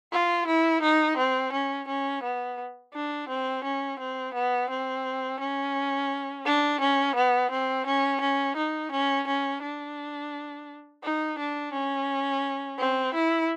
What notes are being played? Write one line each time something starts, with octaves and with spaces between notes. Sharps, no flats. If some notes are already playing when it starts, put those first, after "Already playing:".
F4
E4
D#4
C4
C#4
C#4
B3
D4
C4
C#4
C4
B3
C4
C#4
D4
C#4
B3
C4
C#4
C#4
D#4
C#4
C#4
D4
D#4
D4
C#4
C4
E4